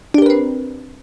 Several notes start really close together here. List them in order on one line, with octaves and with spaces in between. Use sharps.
D4 G4 A#4 B4 C4